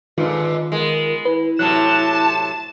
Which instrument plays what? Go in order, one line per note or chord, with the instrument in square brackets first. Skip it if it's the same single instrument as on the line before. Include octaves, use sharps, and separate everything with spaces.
[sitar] G#2 D3 [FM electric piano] D#3 F4 [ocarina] B4
[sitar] G#3 B3 [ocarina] A#4
[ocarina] E4 [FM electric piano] B4
[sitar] A2 C3 F#3 [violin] A5 E7 [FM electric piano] F#6